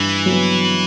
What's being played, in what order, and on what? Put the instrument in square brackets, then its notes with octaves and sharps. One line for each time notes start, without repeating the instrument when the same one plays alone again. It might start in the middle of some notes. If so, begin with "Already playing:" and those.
Already playing: [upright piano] G2 [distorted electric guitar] E3
[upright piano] F#3 B3